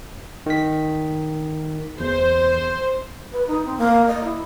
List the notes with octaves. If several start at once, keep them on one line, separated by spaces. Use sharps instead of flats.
D#3 B6
E2 C5
B4
D#4
C4
A#3
D#5
E4